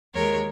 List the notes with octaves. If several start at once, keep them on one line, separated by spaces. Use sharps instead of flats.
D#2 D#3 G#3 A#4 C#5